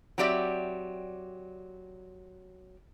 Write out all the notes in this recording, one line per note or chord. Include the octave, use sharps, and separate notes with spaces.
F#3 C4 G4 D5 E5